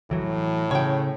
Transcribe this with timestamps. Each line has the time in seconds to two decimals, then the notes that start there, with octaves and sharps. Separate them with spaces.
0.11 A2 E3 F#3
0.71 C#3 C#5 G5